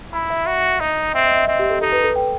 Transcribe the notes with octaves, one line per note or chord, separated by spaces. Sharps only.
E4 B5
E5
F#4
D#4 D#5
C4 E5
D#5
E5
C4 D#5
G4
A4
D#4 A4
B4
A4
G5